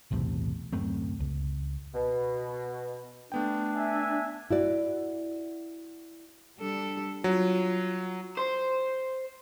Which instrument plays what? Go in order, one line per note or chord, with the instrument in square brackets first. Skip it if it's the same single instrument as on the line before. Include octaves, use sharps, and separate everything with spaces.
[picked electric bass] B1 E2 A2 C3
D1 F#2 A3 C4
C#2
[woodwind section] B2
[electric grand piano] A3 B3 G5 [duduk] D4
[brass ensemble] E5 G#5
[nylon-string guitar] E4 F#4 D5
[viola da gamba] G3 D4 A4
[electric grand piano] F#3 [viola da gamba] F4
[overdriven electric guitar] C5